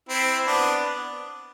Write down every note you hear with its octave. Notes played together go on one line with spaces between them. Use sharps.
C4 E4
B3 D4